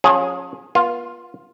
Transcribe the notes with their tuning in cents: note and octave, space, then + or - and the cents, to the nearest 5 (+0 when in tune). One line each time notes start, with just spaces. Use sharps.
F3 +35 C#4 -10 G#4 +0
B3 -40 F4 +0